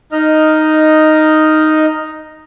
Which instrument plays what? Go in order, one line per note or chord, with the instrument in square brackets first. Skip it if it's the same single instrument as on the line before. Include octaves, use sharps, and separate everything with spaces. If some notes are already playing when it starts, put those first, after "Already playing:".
[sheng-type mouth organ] D#4 D#5 F6